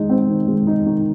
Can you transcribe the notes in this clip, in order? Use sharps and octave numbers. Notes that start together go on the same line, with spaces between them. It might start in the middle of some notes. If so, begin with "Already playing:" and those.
Already playing: D#3 G#3 D#4
C4
D#3
G#3
D#4
D#3